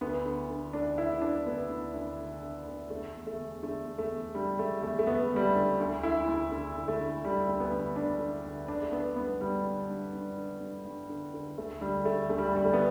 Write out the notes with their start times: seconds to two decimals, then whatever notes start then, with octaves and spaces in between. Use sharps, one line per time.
0.01 D2 B3
0.26 D3
0.50 D3
0.73 D2 D4
0.98 D3 E4
1.22 D2 D4
1.46 D2 B3
1.69 D2
1.94 D2
2.19 D3
2.42 D3
2.66 D2
2.90 D3 A3
3.15 E2
3.27 A3
3.39 E2
3.63 D3 A3
3.86 E2
3.98 A3
4.11 E2
4.35 D3 G3
4.59 E2 A3
4.83 E2 A3
4.99 A3
5.07 E2 B3
5.32 E2 G3
5.43 A3
5.55 D3
5.80 D2
6.03 D3 E4
6.28 D2
6.51 D3
6.76 D2
6.88 A3
7.00 D3
7.24 D3 G3
7.48 D2
7.60 B3
7.72 D2
7.96 D2 D4
8.20 D3
8.45 D2
8.68 D3 D4
8.82 A3
8.92 D3 B3
9.16 G2 B3
9.41 G2 G3
9.65 G2
9.89 G2
10.13 G2
10.37 D3
10.61 G2
10.85 G2
11.09 D3
11.34 D3
11.58 D2 A3
11.81 D3 G3
12.05 D2 A3
12.29 D2 A3
12.38 G3
12.53 D2 G3
12.65 A3
12.73 B3